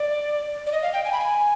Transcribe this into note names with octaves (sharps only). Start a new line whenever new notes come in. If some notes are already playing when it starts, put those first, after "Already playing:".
Already playing: D5
D5
D#5
F5
G5
G#5
B5
G#5